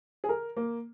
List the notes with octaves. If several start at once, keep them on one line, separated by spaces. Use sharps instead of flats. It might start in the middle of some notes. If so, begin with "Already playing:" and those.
G#4
A#4
A#3